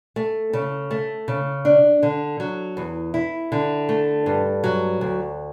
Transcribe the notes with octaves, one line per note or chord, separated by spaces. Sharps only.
A3
C#3
A3
C#3
D4
D3
F#3
E2
E4
D3
A3
G2
F#3
D2